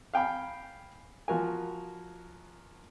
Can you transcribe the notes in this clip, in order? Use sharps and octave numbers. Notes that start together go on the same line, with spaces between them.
F5 G5 G#5 B5
F3 F#4 A#4 G#5